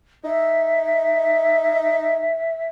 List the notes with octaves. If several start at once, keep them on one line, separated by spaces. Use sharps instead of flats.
D#4 E5